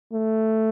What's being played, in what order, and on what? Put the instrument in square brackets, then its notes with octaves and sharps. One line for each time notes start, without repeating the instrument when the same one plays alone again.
[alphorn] A3